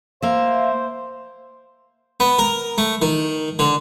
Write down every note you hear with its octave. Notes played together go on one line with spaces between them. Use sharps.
A#3 C5 E5 F5
B3
A#4
A3
D#3
D3